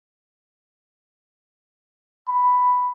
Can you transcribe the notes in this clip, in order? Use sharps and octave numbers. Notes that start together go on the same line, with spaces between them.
B5